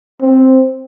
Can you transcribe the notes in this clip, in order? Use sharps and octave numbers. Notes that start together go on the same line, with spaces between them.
C4